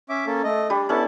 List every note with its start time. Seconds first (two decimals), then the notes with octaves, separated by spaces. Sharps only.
0.09 C#4 E5 D6
0.26 A#3 C#4 A4
0.44 A3 D#5
0.70 G3 D4
0.89 B3 C#4 D4 E4 A4 A5